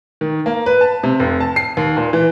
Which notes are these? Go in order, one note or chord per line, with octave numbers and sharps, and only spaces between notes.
D#3
A#3
B4
A5
C3
F1
A5
C7
D#2
A#2
E3